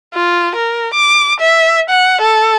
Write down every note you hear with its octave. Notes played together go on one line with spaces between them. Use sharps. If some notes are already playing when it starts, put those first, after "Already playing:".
F4
A#4
D6
E5
F#5
A4